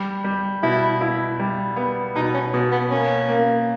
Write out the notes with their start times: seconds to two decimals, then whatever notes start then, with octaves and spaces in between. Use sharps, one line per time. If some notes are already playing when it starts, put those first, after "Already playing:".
Already playing: G3
0.24 G3
0.63 B2 E4
1.01 E4
1.40 G3
1.76 B3
2.16 B2 D#4
2.34 C#4
2.53 B2 B3
2.72 B3
2.90 A#3 C#4
3.29 A#3